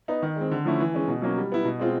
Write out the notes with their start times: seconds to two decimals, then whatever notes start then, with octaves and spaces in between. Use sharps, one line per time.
0.08 B3 D#4
0.22 D#3
0.36 G#3 C4
0.51 D3
0.65 F3 A3 C#4 E4
0.80 E3
0.94 G#3 C#4
1.08 B2
1.22 F#3 A#3 C#4
1.38 G3
1.52 B3 E4
1.65 B2
1.79 G#3 C4 F4